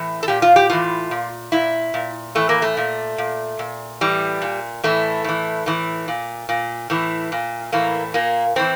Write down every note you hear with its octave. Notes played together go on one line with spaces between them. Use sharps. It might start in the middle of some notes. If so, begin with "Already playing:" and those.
Already playing: A2 E3
A4
A#2 G4
F4
G4
A2 E3 F4
A#2
A#2 E4
A#2
A2 E3 A3
A#3
A3
A#2
A#2
A#2
A2 E3 G3
A#2
A2 E3 A3
A2 E3
A2 E3
A#2
A#2
A2 E3
A#2
A2 E3 A#3
A#2 A#3
A2 E3 C4